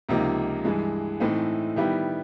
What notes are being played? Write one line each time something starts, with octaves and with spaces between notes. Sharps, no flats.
C#2 C3 F3 A#3 D#4
G2 E3 G#3
A2 E3 A3 C4 D#4
D#3 G3 B3 E4 G4